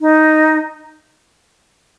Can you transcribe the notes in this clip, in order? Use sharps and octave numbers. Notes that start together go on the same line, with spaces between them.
D#4